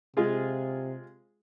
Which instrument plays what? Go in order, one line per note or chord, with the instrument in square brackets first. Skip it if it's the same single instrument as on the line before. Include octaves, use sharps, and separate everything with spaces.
[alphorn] C3 [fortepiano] G#3 F4 G#4